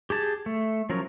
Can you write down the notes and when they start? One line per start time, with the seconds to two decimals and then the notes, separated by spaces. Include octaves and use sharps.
0.10 G4 G#4 A5
0.46 A3
0.90 F3 F#3 C#4 A#4